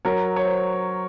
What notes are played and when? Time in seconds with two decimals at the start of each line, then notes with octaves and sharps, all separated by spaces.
0.05 F#3 A#4 C#5
0.36 C#5
0.45 C5